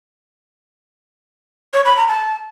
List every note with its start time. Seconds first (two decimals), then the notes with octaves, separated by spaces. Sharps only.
1.74 C#5
1.85 B5
1.97 A#5
2.08 A5